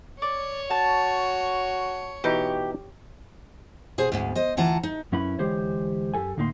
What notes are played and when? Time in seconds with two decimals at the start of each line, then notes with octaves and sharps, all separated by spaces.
0.22 C#5 D5
0.70 F#4 A5
2.24 B2 E3 D#4 G4
3.98 B2 G#4 C5
4.12 D2 G#2 B3
4.35 C5 D#5
4.57 D2 E3 F4 F#5 A5 A#5
4.83 D#4
5.12 F#2 C#4 E4 B4 B5
5.39 D2 E3 G#3 G4 C5 C#5
6.14 F#2 G4 A4 G#5
6.37 D2 A2 A#3 D#4 C#5 C6